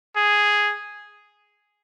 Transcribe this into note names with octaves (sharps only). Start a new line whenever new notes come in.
G#4